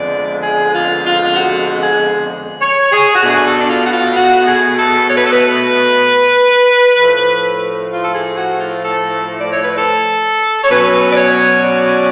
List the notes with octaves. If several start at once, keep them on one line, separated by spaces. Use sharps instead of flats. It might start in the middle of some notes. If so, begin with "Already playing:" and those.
Already playing: F2 D3 G#3 B3 D5
G#4
F4
F4
F#4
G#4
C#5
G#4
F#4
B2 A3 D4 G#4
A4
D4
F4
F#4
F4
F#4
G#4
A4
C#5
B4
A4
B4
A2 F3 A3
F4
A4
G#4
F#4
F4
A4
D5
C#5
B4
A4
C#5
B2 F#3 C#4 B4
D5
C#5
D5